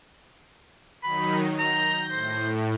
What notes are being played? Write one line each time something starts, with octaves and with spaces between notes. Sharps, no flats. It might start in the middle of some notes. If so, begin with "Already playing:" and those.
D#3 F#3 D#4 B5
A#5 G6 A#6
A2 C5